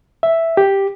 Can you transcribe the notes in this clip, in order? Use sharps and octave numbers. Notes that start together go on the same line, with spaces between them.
E5
G4